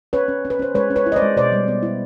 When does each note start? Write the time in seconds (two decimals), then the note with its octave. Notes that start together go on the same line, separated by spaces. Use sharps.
0.13 C#4 B4 C#5
0.28 C#4
0.45 C#4
0.50 B4
0.59 C#4 C5
0.74 G#3 B4 C#5
0.90 C#4
0.96 B4 C#5
1.06 E4
1.12 D#5
1.16 C5 D5
1.22 G#3
1.37 B2 C5 D5
1.52 G3
1.68 B3
1.83 E4